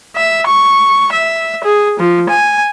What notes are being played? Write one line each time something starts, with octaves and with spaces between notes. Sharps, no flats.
E5
C#6
E5
G#4
F3
G#5